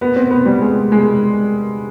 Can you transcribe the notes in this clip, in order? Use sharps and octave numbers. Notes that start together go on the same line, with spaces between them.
B3
C4
B3
G3
G#3
G#3